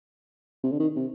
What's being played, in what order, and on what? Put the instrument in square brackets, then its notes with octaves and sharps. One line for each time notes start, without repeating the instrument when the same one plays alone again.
[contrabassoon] C3
D3
D#3
C3